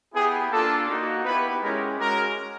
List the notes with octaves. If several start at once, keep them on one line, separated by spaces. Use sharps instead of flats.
B3 E4 G4 G#4
A#3 D4 F4 A4
A#3 D#4 F#4
B3 E4 G4 B4
G#3 C#4 E4 G4 A#4
G#3 C#4 F#4 A#4